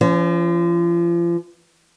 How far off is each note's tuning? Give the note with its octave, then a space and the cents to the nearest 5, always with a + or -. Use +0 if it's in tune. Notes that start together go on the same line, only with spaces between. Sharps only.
F3 -35 C#4 +20